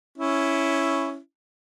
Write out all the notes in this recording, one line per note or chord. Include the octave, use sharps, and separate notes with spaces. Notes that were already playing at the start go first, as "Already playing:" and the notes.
C#4 E4